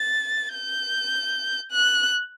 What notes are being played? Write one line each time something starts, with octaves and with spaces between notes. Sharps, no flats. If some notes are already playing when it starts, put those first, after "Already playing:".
Already playing: A6
G6
F#6